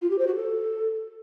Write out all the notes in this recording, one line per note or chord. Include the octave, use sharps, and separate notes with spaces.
F4
G4
C5
F#4
A4